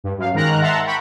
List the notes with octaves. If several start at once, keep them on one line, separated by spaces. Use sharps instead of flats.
G2
F#2 F5
G#2 D#3 A#4 A#5 F#6
E5 F#5 A5 A#5 C6
F#5 G5 B5 C#6